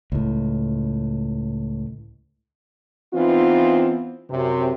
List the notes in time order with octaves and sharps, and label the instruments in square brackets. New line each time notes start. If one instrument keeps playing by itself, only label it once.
[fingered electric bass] C#2 A2
[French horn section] E3 B3 C4 D#4 F4
F#2 C3